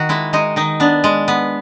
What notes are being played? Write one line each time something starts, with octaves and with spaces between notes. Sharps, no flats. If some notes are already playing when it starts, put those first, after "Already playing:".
Already playing: D#3 F#4
G#3 E4
G#3 D#4
D#3 D#4
B3 D4
G#3
B3